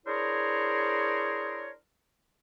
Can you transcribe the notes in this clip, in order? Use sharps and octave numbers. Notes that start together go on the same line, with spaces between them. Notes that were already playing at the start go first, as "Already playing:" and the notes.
D4 E4 G#4 A#4 C5 C#5